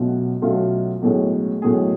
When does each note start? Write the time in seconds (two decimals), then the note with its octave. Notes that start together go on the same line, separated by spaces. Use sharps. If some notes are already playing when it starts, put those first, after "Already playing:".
Already playing: B1 B2 A3 C#4 F4
0.42 B1 B2 A3 C#4 F4
1.02 B1 A2 G#3 C#4 G#4
1.62 B1 A2 G#3 C#4 G#4